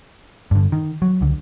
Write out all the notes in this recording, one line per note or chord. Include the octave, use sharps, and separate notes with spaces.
G2 D3
D#3
F#3
C#2 D3